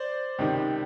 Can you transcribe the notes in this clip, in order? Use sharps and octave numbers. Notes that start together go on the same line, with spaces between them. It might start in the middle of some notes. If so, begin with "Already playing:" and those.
Already playing: C5 D5
C#2 C3 D#3